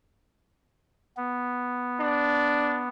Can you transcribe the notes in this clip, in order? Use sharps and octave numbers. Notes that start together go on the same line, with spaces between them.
B3
D4